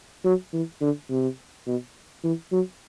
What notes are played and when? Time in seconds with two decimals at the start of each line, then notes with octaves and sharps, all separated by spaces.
0.25 F#3
0.53 E3
0.81 D3
1.10 C3
1.67 B2
2.24 E3
2.52 F#3